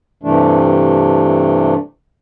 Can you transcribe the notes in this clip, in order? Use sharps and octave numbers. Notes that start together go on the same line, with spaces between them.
G2 C3 E3 A3 D4